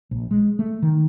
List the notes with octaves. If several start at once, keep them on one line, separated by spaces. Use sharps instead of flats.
A#1
G#3
A3
D#3